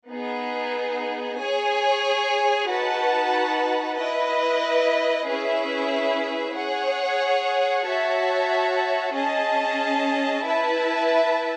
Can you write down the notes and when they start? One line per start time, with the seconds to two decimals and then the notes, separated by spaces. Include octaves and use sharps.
0.11 B3 D#4 G#4
1.40 G#4 C#5 G#5
2.69 D#4 F#4 B4 F#5 A5
3.99 E4 B4 D#5
5.28 C#4 E4 G#4 B4 E5
6.57 G#4 C#5 F#5
7.86 F#4 C#5 E5 A5
9.15 C#4 G#4 D#5 A5
10.44 E4 B4 E5 A5